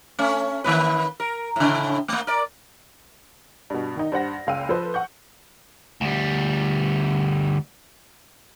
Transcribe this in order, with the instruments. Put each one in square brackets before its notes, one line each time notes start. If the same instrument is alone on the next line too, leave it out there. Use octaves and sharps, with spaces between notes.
[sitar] A3 C#4
D#3 A#3 B4
A#4
A2 C#3
A3 A#3
A#4 D5
[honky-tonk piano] G2 B2
D#3 D#4
G2 C5 F#5 A#6
F#1 C#2 F5 G5 E6 D#7
F3 A4 B4 C5
F#5 C#6 G6
[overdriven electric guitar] D2 G3